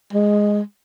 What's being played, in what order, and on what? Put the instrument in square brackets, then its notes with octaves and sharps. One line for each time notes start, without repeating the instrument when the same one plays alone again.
[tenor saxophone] G#3